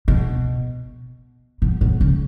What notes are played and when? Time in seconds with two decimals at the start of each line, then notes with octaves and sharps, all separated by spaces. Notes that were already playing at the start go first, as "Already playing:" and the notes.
0.08 B2
1.62 B2
1.81 B2
2.01 C#3